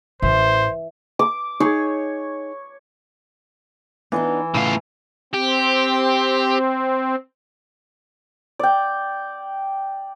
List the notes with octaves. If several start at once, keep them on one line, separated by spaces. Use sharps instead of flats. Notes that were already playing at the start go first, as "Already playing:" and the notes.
A1 E3 C5
D6
D#4 G#4 C#5
E3 B3 D4 D#4
E2 A2 C#3 F4
C4 G4
D5 G5